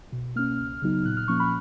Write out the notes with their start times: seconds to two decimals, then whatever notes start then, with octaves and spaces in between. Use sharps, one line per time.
0.12 B2
0.36 A#3 C#4 F6
0.59 C#2
0.82 C#3 F#3 B3 D#4
1.05 A#2 F#6
1.17 F6
1.28 F3 A#3 C#4 C#6
1.40 B5